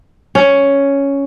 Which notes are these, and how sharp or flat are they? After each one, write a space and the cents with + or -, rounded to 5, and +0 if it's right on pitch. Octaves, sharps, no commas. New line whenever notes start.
C#4 +5